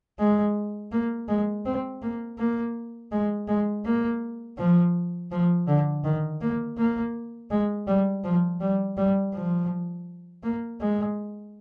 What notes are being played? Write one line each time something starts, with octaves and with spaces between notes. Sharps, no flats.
G#3
A#3
G#3
C4
A#3
A#3
G#3
G#3
A#3
F3
F3
D3
D#3
A#3
A#3
G#3
G3
F3
G3
G3
F3
A#3
G#3